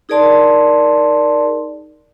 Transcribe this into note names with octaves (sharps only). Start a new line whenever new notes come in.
D#4 G#4 A#4 D5 A5 C6